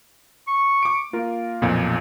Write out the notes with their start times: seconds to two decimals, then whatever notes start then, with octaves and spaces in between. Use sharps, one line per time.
0.47 C#6
0.83 D6 D7
1.13 A#3 F4 A#4
1.61 B1 F2 A#2